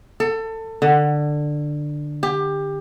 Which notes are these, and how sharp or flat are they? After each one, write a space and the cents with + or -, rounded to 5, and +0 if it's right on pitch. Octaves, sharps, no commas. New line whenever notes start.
A4 +25
D3 +15
G4 +20